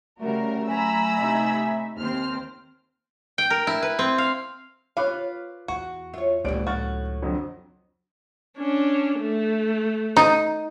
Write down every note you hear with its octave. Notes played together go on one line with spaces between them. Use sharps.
C#3 G3 A3 F#4 A#4
F#3 G#5 A#5 B5 E6
C3 D#4 E5
D#2 C4 C5 F6
G5
A#4
E4
B4
C4
F5
F4 B4 C#5 F5 B5 D6 F#6
E2 F#4
F4 C#5 E5
D#1 C#2 G2 B2 E3 F3 D5 D7
A2 F#4 F6 A6
F2 D3 F#3
C#4 D4
A3
D#4